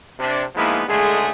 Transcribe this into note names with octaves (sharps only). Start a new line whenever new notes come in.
C3 D4
F3 G#3 A#3 B3 D#4 E4
C#2 D3 G#3 A3 G#4